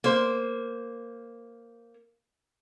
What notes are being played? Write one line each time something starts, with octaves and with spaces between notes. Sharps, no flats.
A#3 C5